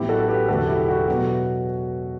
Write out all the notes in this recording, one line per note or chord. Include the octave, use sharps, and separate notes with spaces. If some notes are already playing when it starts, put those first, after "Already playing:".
Already playing: A1 A2 F#3 B3 E4 G4
F#4 A4
G4 B4
E1 D2 D3 F#3 A3 F#4 A4
E4 G4
F#4
B2 F#3 B3 F#4